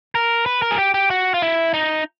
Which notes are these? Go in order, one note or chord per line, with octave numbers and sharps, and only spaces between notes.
A#4
B4
A#4
G#4
G4
G4
F#4
F4
E4
D#4